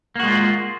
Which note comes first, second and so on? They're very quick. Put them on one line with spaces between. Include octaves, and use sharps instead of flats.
A#3 F#4 G#3 F4